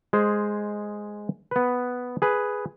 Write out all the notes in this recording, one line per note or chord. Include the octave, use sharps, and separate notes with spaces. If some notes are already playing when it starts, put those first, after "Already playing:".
G#3 G#4 C5
B3 B4
G#4 B4